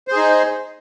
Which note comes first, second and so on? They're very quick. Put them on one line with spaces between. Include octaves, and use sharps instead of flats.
C5 G#4 D#4